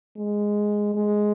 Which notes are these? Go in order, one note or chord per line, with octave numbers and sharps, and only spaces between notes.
G#3
G#3